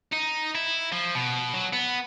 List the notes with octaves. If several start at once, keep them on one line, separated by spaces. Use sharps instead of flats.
D#4
E4
F3
B2
F#3
B3